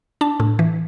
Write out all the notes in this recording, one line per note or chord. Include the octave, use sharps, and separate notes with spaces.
D4 A5
A2
E3